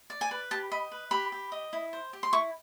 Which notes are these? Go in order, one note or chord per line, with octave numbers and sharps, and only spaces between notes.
D5
G#5
B4
G4 A5
D#5 B5
B4
G4 B5
G4
D#5
E4
C5
G4
C6
E4 C#6